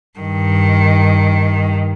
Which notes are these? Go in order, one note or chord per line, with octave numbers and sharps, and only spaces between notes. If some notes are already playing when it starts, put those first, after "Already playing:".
G2 D#3